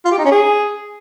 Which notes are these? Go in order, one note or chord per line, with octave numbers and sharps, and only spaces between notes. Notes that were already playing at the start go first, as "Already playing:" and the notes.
F4
G4
D#4
C#4
G#4